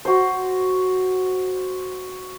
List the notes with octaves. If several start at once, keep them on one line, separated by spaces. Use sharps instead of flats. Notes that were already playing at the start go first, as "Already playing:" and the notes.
F#4 C5